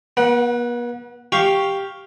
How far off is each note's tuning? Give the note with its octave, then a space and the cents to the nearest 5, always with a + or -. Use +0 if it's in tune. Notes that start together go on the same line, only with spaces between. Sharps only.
B3 -45 F#5 +0
G4 +0 F5 +0 C#6 +0